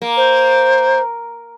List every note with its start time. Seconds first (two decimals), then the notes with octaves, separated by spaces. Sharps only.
0.02 A#3
0.17 C5